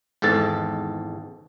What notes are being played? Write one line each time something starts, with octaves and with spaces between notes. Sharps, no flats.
G#1 E2 G#2 A4 A5